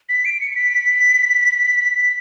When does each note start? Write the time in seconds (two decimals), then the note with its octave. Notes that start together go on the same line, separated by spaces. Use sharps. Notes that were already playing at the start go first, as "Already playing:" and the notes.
0.09 B6
0.25 D7
0.40 C#7
0.51 C#7
0.56 B6
1.97 B6